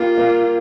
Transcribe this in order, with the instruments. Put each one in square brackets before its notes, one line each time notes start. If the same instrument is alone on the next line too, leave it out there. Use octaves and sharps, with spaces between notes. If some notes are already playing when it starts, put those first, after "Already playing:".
Already playing: [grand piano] A#3 G4 [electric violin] F4
[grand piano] A#3